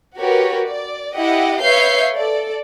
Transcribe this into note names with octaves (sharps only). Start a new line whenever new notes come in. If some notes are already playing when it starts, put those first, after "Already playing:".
F#4 G4 A#4 B4 C#5
D5
E4 G4 D#5 E5 F#5
B4 C#5 E5 F5 G6 C7
A4 D5